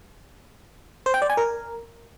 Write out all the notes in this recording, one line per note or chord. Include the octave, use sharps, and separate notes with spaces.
C5
G5
D5
G#5
A#4